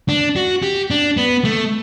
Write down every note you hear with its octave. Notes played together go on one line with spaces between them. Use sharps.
D4
F#4
G4
D4
B3
A3